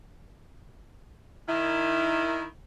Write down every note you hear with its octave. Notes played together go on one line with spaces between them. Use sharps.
D#3 E4